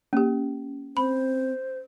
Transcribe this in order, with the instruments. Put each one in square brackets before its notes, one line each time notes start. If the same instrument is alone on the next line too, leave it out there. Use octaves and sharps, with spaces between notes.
[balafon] A#3 G4 [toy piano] C#4
[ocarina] C4 [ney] C5 [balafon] B5